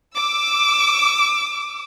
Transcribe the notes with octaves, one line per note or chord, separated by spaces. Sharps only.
D6 E6